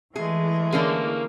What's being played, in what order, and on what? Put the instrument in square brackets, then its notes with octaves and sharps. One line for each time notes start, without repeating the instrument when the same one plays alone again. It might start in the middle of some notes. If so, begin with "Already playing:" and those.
[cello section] E3 [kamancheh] G#3 A3 [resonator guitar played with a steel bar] G#4
[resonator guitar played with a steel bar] D3 C#4 G#4 [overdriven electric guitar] A#3